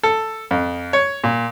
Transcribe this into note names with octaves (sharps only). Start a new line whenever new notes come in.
A4
F2
C#5
A#2